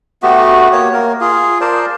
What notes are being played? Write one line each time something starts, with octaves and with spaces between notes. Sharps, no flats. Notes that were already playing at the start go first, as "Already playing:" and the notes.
A3 B3 F#4 G4
A#3 C#5
A#3 A#4
F4 G#4
A#4 C5 D5 A5